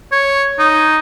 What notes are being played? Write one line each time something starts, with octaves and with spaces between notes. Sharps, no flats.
C#5
D#4